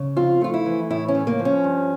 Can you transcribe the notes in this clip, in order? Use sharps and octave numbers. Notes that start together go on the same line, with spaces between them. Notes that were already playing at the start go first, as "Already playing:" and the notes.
Already playing: C#3
F2 F4
A3 F4
E4
E3
A2 E4
C#4
A3
A#3
F3
C#4
G2